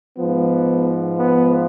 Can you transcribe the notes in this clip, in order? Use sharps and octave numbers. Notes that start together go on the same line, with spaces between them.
G#2 F3 B3
B3